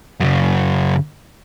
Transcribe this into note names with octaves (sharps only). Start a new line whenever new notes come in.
F#2 C#3